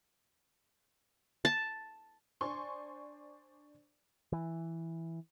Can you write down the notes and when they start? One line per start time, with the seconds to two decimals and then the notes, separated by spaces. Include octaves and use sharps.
1.45 A5
2.41 D4 C5 D5 G#5 C6 C#6
4.32 E3